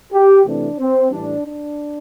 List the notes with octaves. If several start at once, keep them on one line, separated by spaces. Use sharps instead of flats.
G4
C3 E3 A3 C4 D4
C4
A2 E3 G3 D4
D4